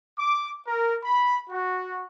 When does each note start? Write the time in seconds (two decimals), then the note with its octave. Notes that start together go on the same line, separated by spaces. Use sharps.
0.19 D6
0.67 A#4
1.03 B5
1.50 F#4